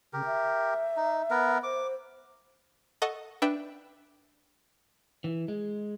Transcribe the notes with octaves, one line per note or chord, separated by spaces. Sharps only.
C#3 G4 A#4
E5
D#4
B3 A#4
C5 D6
A4 D#5 F#5 C#6
D4 B4 E5 G5
E3
G#3